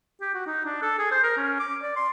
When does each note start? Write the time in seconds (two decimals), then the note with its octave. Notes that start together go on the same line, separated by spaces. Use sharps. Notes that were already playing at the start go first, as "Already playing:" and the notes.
0.21 G4
0.34 F#4
0.46 D#4
0.65 D4
0.82 A4
0.99 G#4
1.11 C5
1.24 A#4
1.37 C#4
1.60 D6
1.82 D5
1.96 C6